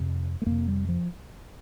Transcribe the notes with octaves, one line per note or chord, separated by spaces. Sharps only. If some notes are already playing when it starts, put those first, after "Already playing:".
Already playing: F2 C3
A3
F2 C3 A#3
G3
F3